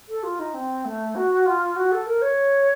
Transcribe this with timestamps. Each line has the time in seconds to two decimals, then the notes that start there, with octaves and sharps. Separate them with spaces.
0.09 A4
0.23 F4
0.39 D#4
0.54 C4
0.85 A3
1.15 F#4
1.46 F4
1.76 F#4
1.92 A4
2.06 A#4
2.22 C#5